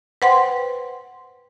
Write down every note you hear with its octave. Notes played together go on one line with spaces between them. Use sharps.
B4 C5 F#5 G5 C6